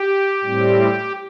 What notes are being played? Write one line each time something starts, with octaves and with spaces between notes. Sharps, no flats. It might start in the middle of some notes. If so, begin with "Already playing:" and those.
Already playing: G4
A2 G3 C4